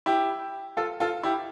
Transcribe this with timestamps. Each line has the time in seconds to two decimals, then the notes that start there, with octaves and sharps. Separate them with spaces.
0.06 E4 G4
0.77 F4 A4
1.00 F4 A4
1.23 E4 G4